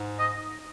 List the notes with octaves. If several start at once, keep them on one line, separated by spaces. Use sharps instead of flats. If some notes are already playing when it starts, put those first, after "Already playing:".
Already playing: G#2
D#5